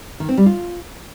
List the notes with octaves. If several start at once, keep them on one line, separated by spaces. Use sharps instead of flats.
D#3
C4
G3
F4